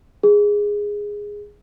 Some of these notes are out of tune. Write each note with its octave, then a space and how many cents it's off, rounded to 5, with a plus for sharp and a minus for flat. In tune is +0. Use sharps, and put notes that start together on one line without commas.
G#4 -10